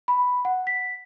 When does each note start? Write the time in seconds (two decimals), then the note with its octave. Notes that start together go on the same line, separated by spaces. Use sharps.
0.08 B5
0.45 F#5
0.67 B6